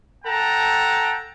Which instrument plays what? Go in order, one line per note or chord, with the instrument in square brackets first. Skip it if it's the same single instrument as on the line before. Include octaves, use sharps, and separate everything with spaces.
[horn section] A4 F#5 G5 A5 A#5